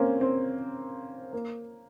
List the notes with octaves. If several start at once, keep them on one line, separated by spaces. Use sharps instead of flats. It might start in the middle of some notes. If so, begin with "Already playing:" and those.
Already playing: A#3 C4 C#4
C4
A#3